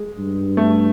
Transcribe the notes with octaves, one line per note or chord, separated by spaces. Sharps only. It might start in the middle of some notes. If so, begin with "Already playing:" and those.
Already playing: G#3
G2
A3